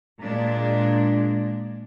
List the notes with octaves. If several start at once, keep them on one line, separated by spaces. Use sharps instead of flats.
A#2 G#3 D4